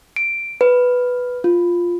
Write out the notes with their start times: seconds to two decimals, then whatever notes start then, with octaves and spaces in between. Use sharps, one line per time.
0.16 D7
0.61 B4
1.44 F4